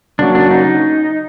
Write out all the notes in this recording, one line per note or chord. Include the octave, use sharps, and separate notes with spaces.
C#3 F#3 A#3 C#4 D4 F#4
D4
D#4